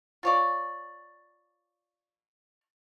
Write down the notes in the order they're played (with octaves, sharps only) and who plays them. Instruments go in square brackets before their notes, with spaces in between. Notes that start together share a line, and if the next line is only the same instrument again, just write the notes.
[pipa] F4 C#5 D5